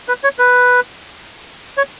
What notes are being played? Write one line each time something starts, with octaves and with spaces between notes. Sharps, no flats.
B4
C#5
B4
C#5